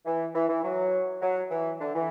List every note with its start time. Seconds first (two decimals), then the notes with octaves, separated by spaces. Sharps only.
0.06 E3
0.35 E3
0.49 E3
0.64 F#3
1.21 F#3
1.50 E3
1.80 D3
1.95 E3